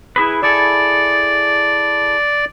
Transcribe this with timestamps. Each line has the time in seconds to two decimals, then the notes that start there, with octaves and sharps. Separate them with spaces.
0.16 E4 G#4 B4
0.43 E4 G#4 A4 D5